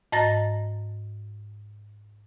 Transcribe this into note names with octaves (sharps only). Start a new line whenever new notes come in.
G#2 D#5 A5 A#5 A6 A#6